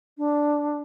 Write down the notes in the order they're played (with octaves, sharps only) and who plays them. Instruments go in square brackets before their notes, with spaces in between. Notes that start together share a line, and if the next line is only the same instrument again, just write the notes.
[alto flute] D4